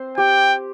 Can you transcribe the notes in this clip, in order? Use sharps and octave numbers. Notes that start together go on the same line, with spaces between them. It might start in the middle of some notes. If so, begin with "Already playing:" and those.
Already playing: C4 C5
G4 G5